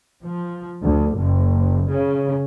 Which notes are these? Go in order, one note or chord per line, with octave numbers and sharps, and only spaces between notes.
F3
D2
F#1
C#3